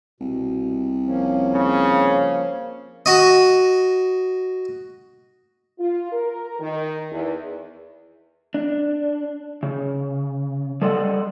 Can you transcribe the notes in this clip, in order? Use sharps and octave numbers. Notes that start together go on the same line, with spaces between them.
C2 B2
F3 A#3 C#4
C#3
F#4 D#5
F4
A#4
D#3
E2
D4
C#3
G3 A4 C5 D5 D#5 F#5